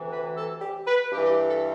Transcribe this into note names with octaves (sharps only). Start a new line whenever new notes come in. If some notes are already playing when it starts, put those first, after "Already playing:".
Already playing: D2 C3 E3
B4
A4
G4
B4
G2 E3 G4
G4
A4